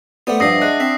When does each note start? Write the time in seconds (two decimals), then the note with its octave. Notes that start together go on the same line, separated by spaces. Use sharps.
0.27 A3 B3 C5 D5 F#5
0.40 G2 F3 D4 E5 B5 D#6 A#6 C7
0.62 G#3 F#6
0.80 C4 B6